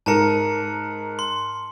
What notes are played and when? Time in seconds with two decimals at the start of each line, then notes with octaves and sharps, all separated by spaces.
0.06 G#2 A#4 A5 A#5 C#7
1.19 C6